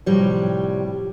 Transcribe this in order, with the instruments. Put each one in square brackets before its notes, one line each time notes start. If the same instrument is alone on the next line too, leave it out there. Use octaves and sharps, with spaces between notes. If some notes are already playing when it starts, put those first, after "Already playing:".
[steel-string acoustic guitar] A2 C3 F3 G3 C#5